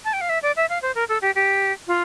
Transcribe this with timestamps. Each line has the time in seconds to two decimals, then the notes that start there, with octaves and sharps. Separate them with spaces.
0.04 A5
0.13 G5
0.21 F5
0.29 E5
0.42 D5
0.56 E5
0.69 F5
0.82 C5
0.95 A#4
1.09 A4
1.22 G4
1.35 G4
1.87 F4